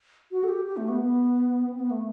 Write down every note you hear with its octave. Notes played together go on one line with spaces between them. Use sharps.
F#4
A4
G4
G4
A3
B3
B3
C4
B3
A3